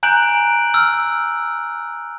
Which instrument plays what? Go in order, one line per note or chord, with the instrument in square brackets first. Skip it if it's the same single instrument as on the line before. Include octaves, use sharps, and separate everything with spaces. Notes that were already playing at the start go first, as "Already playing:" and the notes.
[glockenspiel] G#5 A#5 F#6 G6 D7 F#7
E6 F6